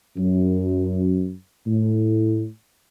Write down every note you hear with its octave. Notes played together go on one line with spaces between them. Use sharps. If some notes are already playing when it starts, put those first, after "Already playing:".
F#2
A2